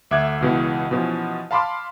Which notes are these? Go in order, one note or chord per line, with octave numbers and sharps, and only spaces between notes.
D2 E5 D6 F#6 G#6
C#2 B2 E3
B2 E3 F3 C#4
F5 A5 B5 C6 D6 F6